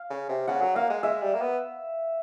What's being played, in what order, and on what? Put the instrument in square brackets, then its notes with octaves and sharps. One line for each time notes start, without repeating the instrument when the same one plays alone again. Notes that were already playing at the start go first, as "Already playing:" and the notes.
Already playing: [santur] F5
[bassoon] C#3
C3
[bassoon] C#3 [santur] F#5
[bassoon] F#3
[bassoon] A#3 [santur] F5
[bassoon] G#3
[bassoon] G#3 [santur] E5
[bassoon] G3
A#3
B3